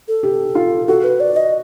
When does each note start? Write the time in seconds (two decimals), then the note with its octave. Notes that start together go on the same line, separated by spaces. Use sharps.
0.08 A4
0.23 G4
0.55 F4
0.88 F#4 A4
1.04 B4
1.20 D5
1.36 D#5